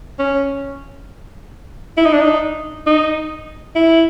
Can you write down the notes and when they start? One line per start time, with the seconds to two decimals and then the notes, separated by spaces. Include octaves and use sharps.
0.19 C#4
1.98 E4
2.05 D#4
2.13 D4
2.21 D#4
2.87 D#4
3.76 E4